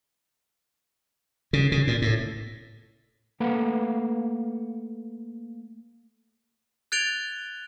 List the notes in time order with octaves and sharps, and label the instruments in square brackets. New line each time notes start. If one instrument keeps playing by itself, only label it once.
[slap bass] C#3
C#3
A#2
A2
[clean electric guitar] A3 A#3 A4 B4 F5 F#5
[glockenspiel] F#6 G#6 A6 D7 F7 G7